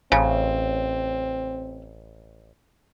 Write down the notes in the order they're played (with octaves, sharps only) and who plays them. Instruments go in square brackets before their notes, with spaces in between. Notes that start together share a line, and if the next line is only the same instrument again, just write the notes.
[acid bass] A1 [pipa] C#3 [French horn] C4